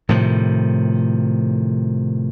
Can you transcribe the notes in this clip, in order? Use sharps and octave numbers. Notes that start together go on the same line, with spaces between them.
A2 C3 D#3 F3